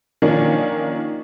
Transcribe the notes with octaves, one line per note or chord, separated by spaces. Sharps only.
D#3 F3 A#3 C#4 D4